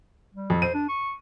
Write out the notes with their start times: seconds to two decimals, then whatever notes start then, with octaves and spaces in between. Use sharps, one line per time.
0.34 G3
0.50 F2
0.62 C5 D#7
0.74 D4
0.89 C#6